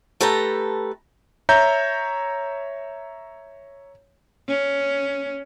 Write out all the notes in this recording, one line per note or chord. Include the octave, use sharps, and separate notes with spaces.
A3 G4 A4 B4 A#5
C#5 E5 A#5 G6
C#4